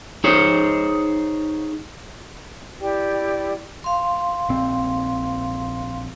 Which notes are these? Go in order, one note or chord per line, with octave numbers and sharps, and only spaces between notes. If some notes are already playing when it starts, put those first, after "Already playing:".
D#4 G#4 C5 C#5
E4 G4 D5 G5
F5 C6
A#1 C4